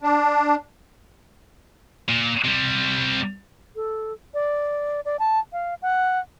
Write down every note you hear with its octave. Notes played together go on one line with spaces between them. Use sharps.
D4
A#2
C3 G3
A4
D5
D5
A5
F5
F#5